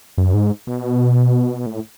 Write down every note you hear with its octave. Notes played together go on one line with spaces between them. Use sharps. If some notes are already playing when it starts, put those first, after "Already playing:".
F#2
G#2
B2
A2